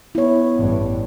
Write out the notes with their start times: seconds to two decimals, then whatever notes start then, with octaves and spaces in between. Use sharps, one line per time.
0.15 B3 E4 C#5
0.57 A1 G2